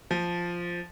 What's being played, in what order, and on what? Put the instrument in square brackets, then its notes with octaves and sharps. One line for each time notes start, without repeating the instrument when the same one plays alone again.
[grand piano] F3